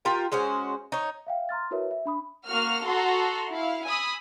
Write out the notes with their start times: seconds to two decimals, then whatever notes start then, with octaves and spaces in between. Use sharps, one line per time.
0.05 F4 G4 A#4 G5
0.32 G#3 C#4 F#4 C5
0.92 D#4 C#5
1.27 E5 F5 G5
1.49 A#5 C6 F6 A6
1.71 E4 F#4 A#4 B4 C#5 E5
1.91 E5
2.05 D4 B5 D#6
2.47 A#3 F#4 F6
2.86 F#4 A4 A#5 C6
3.50 E4 F5
3.86 G#5 B5 D#6 E6